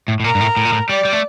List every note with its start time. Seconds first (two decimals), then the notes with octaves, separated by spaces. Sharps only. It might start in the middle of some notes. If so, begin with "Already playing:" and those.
0.08 A2
0.20 A2
0.24 A#2 A#4
0.35 G2
0.40 A2
0.57 A2
0.65 A#2
0.72 A2
0.89 G3 D5
1.05 G3
1.13 A3